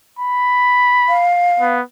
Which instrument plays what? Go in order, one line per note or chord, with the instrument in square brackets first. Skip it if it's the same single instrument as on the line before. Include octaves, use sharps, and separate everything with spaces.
[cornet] B5
[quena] F5
[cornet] B3